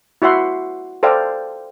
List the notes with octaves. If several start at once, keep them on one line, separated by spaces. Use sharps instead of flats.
E4 F#4 E5 F#5 C6
A4 C5 D5 F5 G5